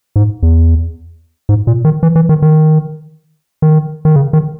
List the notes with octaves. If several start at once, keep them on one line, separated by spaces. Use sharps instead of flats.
G#2
E2
G#2
A#2
D#3
E3
E3
D#3
D#3
D#3
D#3
C#3
D#3